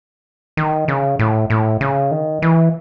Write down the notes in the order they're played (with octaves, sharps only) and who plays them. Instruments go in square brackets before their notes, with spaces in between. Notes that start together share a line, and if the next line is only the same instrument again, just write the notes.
[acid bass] D#3
C#3
A2
A2
C#3
D#3
E3